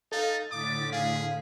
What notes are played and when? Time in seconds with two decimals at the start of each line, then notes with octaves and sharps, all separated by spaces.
0.12 D#4 A4 F5 A6
0.51 A2 D3 D6 D#6 B6
0.92 G#4 F5